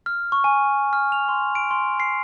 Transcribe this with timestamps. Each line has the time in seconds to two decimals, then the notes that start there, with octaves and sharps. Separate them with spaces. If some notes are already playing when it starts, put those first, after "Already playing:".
0.06 F6
0.32 C#6
0.44 G#5
0.93 F6
1.12 F7
1.29 C6
1.55 D7
1.71 C6
2.00 C7